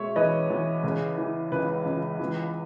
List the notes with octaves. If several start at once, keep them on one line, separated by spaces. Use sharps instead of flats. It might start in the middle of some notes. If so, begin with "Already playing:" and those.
Already playing: B2 G#3 C#5 E5
E2 B4 D#5
E2
C#3
E3
C#2 B4
C#2
E2